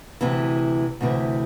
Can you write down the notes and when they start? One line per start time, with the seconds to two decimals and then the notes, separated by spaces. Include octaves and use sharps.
0.21 D2 C3 E3
1.01 D2 C3 E3